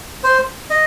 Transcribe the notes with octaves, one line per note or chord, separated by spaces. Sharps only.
C5
D#5